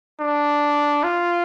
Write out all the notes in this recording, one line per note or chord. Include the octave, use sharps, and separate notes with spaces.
D4
F4